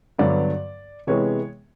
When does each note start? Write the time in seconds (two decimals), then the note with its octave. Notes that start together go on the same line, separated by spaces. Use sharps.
0.19 G2 D3 F#3 B3 D5
1.07 C3 E3 G#3 B3 C#5